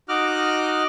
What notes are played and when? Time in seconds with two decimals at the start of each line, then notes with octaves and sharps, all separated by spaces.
0.09 D#4 F#4 D#5 D6 F6 F#6